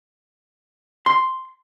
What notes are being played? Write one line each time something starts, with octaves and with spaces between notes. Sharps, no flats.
C6